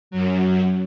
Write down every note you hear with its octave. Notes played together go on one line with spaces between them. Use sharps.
F#2 F#3